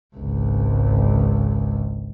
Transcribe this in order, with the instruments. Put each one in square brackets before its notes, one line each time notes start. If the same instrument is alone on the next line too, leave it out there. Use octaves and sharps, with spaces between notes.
[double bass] G#1 C#2